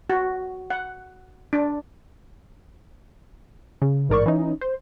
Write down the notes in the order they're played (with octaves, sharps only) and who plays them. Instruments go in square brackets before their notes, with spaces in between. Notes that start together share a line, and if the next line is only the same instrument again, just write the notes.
[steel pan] F#4
F#5
D4
[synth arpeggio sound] C#3
A1 G#2 A#4 D5 C#6
E3 C#4 D#4
C5